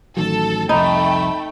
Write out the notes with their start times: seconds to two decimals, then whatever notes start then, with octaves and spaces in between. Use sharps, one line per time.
0.17 A1 D#3 F#3 A4 A5
0.69 C2 F2 A3 D#4 G5 B5